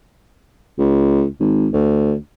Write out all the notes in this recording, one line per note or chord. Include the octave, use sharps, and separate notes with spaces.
C#2
G#1
D2